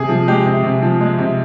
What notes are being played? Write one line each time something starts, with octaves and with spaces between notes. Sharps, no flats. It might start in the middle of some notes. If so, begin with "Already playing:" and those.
Already playing: C3 G#4
F3
G#3 G4
C3
C3
F3
G#3
C3